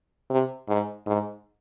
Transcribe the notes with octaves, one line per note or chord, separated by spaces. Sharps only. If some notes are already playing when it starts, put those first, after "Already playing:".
C3
G#2
G#2